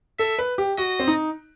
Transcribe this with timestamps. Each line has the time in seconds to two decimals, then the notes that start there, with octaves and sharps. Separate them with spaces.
0.19 A4 E5
0.39 B4
0.58 G4
0.78 F#4 D#5
0.99 C4
1.07 D#4